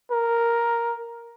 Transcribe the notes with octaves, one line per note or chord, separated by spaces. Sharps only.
A#4